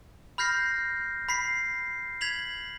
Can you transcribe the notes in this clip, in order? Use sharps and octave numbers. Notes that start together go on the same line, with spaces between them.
B5 F6 G6 A#6 C7
B5 B6 C7
G#6 B6 F7 F#7